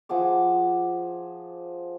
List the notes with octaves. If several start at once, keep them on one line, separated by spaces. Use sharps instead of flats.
F3 G#4 F#5 D6